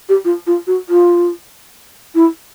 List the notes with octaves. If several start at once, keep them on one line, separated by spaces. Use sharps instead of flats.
G4
F4
F4
F#4
F4
E4